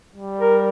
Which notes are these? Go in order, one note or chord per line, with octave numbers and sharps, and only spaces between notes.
G3
A#4